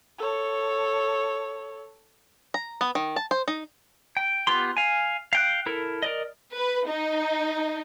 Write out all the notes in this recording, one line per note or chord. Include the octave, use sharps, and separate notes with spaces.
A4 C#5
A#5
B3
D#3
A5
C5
D#4
G5
B3 F4 G4 C6
F5 G#5
F5 G5 F#6
E4 A4 A#4
A#4 D5 D#5
B4
D#4